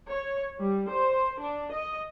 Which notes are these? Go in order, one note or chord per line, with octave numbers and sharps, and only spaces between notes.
C#5
G3
C5
D4
D#5